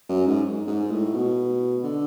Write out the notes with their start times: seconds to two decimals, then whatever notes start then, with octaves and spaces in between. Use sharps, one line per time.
0.09 F#2
0.27 G#2
0.67 G#2
0.91 A2
1.14 B2
1.84 D3